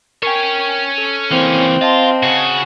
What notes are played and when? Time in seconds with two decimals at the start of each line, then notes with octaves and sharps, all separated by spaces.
0.23 C#4 A#4 C#5 G5
0.98 A4
1.31 E3 A#3 C4
1.81 F4 D#5 F5 A5
2.23 C#3 F#4